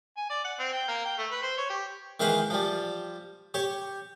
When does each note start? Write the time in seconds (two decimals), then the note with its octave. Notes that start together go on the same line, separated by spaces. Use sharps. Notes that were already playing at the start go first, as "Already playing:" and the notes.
0.17 G#5
0.30 D5
0.44 F#5
0.59 C4
0.73 G5
0.88 A#3
1.05 G5
1.18 A3
1.31 B4
1.43 C5
1.58 C#5
1.69 G4
2.20 D#3 E3 G#3 B4 F5 G5
2.50 F3 G3
3.54 G4 C#5